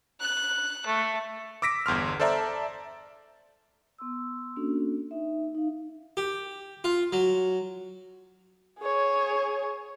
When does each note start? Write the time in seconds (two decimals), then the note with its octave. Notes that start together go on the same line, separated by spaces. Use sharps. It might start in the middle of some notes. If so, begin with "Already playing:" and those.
0.20 F#6
0.86 A3
1.62 D6 E6 A#6 B6 D7
1.86 G1 E2 C6 F6
2.20 A4 C5 D5 E5 A5 A#5
3.98 B3 C6 E6
4.56 A#3 C#4 D4 F#4 A4
5.11 D#4 E5
5.55 D#4 F5
6.17 G4
6.84 F4
7.13 F#3
8.79 G#4 C#5